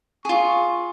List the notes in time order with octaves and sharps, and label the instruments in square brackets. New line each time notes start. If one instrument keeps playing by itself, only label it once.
[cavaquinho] F4 G#4 [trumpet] C#6